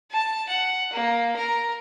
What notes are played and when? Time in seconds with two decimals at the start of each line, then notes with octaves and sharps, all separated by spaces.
0.11 A5
0.49 F#5
0.93 A#3
1.36 A#4